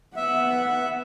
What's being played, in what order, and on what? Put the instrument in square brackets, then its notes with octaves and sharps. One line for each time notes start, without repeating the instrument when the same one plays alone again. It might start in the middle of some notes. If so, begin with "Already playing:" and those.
[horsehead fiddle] B3 F#5 [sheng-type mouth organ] E5